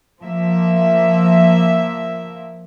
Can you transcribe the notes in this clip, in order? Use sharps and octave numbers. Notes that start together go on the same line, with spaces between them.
F3 A#3 E5